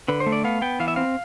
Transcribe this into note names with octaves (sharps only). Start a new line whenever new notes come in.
D3 B4
C5
A3
D5
B3 F5
B3 G5
E3 F5
E5
C4 F5